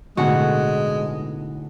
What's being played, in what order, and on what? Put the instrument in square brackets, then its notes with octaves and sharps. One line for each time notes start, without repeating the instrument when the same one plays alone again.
[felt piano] B1 A2 [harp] D3 B3 G#5 [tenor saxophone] G#3 [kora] F#4